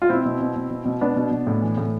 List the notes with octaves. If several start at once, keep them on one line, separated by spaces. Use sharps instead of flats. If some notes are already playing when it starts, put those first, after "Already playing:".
F4
B2 C4 E4
B2
B2
B2
B2
B2
B2 B3 D4
B2
B2
A2
E3
A2